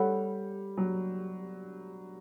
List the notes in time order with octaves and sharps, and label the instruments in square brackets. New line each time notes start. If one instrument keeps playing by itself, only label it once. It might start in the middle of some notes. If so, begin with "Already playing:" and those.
Already playing: [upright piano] G3 [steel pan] A4 C#5 F#5 B5
[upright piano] F#3